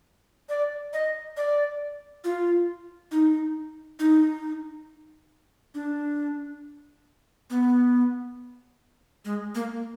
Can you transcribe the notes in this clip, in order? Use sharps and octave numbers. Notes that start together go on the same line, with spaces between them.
D5
D#5
D5
F4
D#4
D#4
D4
B3
G#3
A#3